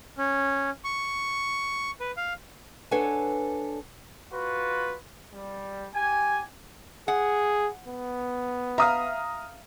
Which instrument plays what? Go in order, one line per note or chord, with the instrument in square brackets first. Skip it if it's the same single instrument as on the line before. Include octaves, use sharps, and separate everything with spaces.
[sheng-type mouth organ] C#4
C#6
B4
F5
[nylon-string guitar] D4 A4 B4 C#5 F#5 G#5
[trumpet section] F4 F#4 B4
G3
G4 G#5
[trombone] G#4 [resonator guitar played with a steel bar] F#5
[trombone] B3
[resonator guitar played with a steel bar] E5 F5 [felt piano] A#5 D#6 F6